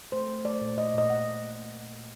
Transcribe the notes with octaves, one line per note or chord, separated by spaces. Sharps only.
A3 C5
A3
A3 D5
A#2
A#2 D#5
A#2 D#5
A#2 F#5
A#2
A#3
A#3
A#2
A#2